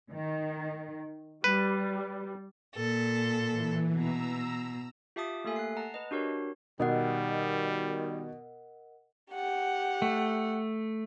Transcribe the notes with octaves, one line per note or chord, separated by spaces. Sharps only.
D#3
G3 B4
A#2 A4
E3
B2 A#5 E6
F4 G4 E5 A5 D6 D#6
A3 A#3 G4 A4 E5 G#5
F#6 C7
F#5 A5 A#5
B4 D#5
D4 F#4 G4 A#4 C#5
B2 D#3 G3 A#4 D#5 F#5
G4 F#5
A3